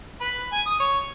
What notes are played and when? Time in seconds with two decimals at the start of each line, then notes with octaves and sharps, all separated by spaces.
0.20 B4
0.52 G#5
0.66 D#6
0.80 C#5